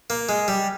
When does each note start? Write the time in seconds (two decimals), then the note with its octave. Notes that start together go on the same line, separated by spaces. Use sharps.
0.10 A#3
0.29 G#3
0.48 G3